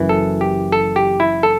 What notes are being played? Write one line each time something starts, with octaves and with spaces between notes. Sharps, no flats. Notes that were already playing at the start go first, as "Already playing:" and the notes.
Already playing: F#1 F#2 E3
A4
G4
A4
G4
E4
A4